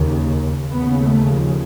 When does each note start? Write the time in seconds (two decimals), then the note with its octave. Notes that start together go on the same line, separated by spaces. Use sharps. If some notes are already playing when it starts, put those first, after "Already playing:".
Already playing: D#2 C#3
0.72 D#2 C#3 B3
1.01 A3
1.31 F3